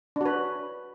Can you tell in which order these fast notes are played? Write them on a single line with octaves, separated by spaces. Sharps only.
D4 F#4 B4